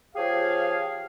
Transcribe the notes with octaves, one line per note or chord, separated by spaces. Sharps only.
F3 G4 G#4 C#5 F5